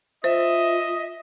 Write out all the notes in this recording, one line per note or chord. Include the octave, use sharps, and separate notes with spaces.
F4 C5 D#5 E5